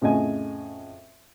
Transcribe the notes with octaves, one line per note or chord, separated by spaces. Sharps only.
F2 A2 C#3 D#5 G#5